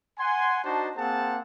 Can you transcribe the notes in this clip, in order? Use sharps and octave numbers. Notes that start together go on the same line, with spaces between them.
F#5 G#5 C6
D4 D#4 F#4 C5 A5
A#3 C4 G#4 C5 F#5 A5